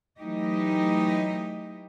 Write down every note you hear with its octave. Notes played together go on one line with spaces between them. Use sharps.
E3 F#3 A3 D#4 G4 D#5